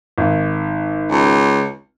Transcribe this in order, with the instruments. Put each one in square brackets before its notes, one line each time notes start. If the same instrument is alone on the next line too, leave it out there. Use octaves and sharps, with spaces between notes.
[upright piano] G#1
[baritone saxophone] C#2